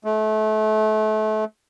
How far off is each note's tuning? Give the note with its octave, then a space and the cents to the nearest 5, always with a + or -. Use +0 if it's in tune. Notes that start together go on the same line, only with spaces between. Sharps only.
A3 -30